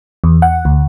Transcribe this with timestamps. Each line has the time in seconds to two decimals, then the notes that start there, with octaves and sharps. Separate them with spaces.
0.24 E2
0.42 F#5
0.65 D2